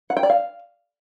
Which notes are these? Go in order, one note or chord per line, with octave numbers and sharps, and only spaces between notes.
F#5
G5
D5
F5